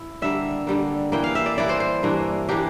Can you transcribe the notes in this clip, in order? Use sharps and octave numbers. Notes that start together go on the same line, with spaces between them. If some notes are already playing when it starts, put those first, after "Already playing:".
Already playing: E4
D3 G3 A#3 E5
D3 G3 A#3
E3 A#3 E4 G5
F5
E5
D5
E3 A#3 E4 D5
C5
C5
G2 E3 A#3 D4
E3 A#3 D4 G4